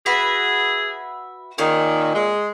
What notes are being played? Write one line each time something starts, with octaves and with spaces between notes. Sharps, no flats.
F#4 G#4 B4 E5
A#2 D#3 C#4 G#4
G#3